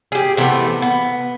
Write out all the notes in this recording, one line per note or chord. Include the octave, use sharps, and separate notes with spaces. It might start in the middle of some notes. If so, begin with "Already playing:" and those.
G4 G#4
C3 E3 A3 B3
B3